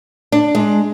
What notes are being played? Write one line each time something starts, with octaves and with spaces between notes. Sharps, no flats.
D4
G#3